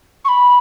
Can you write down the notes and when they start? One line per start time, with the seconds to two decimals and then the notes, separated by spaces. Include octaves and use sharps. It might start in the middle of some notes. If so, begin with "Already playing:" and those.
0.24 C#6
0.28 B5